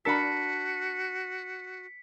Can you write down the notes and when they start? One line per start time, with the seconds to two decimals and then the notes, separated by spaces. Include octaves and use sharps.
0.05 D4 F#4 A#4 A5 B5 E6 B6 C#7